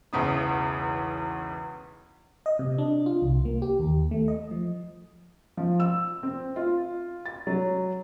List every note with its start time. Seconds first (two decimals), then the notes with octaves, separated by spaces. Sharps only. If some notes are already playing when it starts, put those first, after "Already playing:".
0.13 E1 B1 E2 C#3 D#6
2.46 D#5
2.59 C3
2.78 D4
3.06 F4
3.22 C2
3.45 A#3
3.62 G4
3.80 D#2
4.11 A3
4.28 D#5
4.51 F3
5.57 F3
5.80 E6
6.23 C4
6.56 F4
7.26 A6
7.47 F#3